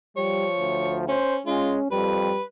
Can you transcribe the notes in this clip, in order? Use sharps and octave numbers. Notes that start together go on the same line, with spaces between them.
F3 G3 C#5
D2
C#4 C5
G#3 C#4 F4
F2 G3 B4